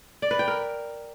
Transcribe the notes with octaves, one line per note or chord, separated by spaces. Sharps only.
D5
B4
G5
A#4